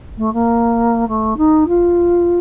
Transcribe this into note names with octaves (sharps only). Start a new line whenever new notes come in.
A3
A#3
A3
D#4
F4